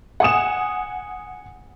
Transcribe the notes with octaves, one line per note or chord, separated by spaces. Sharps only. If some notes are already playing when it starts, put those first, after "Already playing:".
F#5 G#5 D#6 E7